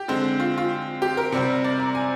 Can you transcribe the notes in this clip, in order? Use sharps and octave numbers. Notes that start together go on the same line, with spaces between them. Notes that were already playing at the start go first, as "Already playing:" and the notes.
Already playing: G4
D3 G#3 C4
F4
F4
G4
A#4
C3 G3 C4
D5
A#5
G#5